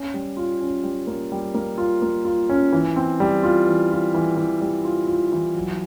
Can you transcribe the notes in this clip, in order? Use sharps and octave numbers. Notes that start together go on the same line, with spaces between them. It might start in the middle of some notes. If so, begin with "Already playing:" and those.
Already playing: C#4
G3
F4
C#4
G3
A#3
G3
A#3
F4
A#3
F4
C#4
E3
C4
G3
F4
E3
F4
E3
E3
G3
F4
F4
E3
F#3